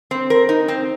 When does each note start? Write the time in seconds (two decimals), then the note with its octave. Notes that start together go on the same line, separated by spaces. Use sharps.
0.11 C4
0.30 A#4
0.49 D#4
0.68 C4